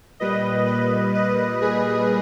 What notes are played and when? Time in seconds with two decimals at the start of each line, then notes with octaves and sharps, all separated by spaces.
0.20 A#2 G3 B4 D#5
0.66 B4 D#5
1.14 B4 D#5
1.62 G#4 B4